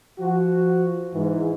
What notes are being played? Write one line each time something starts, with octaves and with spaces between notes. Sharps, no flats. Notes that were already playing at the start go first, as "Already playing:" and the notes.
F3 F#4
G#2 E3